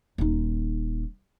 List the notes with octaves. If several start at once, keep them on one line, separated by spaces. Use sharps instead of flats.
D#1 D#4